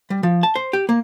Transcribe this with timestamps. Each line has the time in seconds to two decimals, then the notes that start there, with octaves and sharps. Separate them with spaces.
0.10 G3
0.23 F3
0.43 A5
0.56 C5
0.73 G4
0.89 A#3